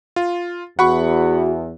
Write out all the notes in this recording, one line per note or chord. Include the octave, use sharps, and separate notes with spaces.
F4
E2 F#4 F#5 B5 C#6